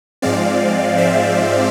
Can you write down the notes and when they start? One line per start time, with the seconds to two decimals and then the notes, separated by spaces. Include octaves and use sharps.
0.22 G#2 F3 G#3 C4 D5 F5
0.98 C5 E5